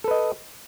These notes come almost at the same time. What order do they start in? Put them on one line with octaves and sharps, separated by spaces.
A4 B4 D#5